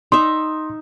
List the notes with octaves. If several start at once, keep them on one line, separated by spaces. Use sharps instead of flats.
D#4 E5 C6